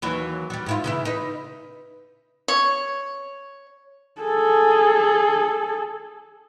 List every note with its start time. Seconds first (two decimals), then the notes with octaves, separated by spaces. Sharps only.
0.02 D#2 E3 F#3
0.50 F#3 G3
0.66 G#2 E4 F4
0.84 C#3 E3 E4
1.05 D#4 B4
2.48 C#5
4.22 G#4 A4